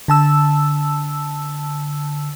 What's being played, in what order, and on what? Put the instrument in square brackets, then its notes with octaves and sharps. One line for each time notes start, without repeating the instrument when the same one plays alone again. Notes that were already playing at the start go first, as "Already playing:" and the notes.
[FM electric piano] D3 A5 E6